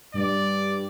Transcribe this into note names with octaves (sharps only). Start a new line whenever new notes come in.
G2 D5